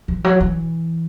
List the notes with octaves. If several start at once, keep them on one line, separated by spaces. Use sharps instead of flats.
E3
F#3
E3